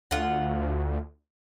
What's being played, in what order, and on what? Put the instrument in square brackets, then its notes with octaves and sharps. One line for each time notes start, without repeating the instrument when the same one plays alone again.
[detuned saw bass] D2 [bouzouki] F4 F#5